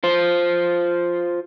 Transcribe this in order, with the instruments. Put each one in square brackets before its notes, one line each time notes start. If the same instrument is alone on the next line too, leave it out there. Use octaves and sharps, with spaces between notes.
[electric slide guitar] F4 C5